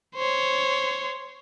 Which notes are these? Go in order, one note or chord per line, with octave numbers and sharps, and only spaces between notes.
C5 C#5